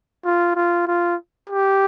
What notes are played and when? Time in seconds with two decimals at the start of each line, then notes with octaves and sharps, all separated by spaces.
0.25 F4
0.55 F4
0.87 F4
1.49 G4